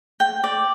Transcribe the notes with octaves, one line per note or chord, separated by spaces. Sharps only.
G5
D5